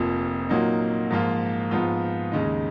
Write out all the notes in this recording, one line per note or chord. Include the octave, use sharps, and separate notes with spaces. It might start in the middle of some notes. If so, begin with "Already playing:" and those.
Already playing: F1 F2 F3 A#3
A#2 F#3 A#3 D#4
G#2 F3 A#3 F4
G#2 F3 B3 F4
D#2 C#3 G#3 D#4